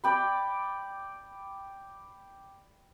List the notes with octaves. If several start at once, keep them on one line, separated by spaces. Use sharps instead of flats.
D5 G5 B5